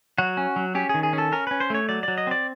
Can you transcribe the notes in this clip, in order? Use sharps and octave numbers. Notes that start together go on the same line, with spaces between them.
F#3 F#4
C#4
F#3
C#4 G4
G#4
D#3
G#4
C#4
A4
C#4 A#4
C#4 B4
C5
A3 C#5
F#3 D5
F#3 D5
D#5
C4 D5